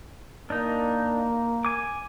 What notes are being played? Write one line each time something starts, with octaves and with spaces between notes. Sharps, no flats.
A#3 D4 D#4
G#5 D6